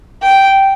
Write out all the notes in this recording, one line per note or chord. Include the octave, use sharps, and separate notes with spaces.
G5